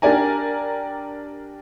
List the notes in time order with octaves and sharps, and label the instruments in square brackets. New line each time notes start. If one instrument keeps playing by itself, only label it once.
[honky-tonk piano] D4 G4 A#4 D5 G#5 A#5